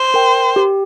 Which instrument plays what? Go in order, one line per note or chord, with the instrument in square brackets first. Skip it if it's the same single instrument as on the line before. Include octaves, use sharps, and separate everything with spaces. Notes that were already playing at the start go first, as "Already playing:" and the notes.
Already playing: [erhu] C5
[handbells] A#4 G5
G4